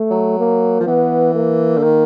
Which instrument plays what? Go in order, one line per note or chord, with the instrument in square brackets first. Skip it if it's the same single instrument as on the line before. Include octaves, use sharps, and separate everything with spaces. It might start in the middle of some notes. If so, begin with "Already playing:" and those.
Already playing: [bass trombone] A3
[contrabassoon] F#3
[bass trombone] A#3
[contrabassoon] F3
[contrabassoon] E3 [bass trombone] B3
[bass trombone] A#3
[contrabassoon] D3
D#3